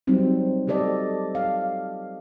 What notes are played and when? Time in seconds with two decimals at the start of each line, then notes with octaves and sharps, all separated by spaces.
0.07 F#3 G3 C4 D#4
0.67 A3 G4 A4 D5 D#5
1.35 F5